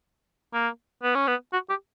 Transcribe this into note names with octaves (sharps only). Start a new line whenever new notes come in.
A#3
B3
C#4
B3
F#4
G4